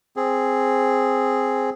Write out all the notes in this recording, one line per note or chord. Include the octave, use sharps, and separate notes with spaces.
C4 G#4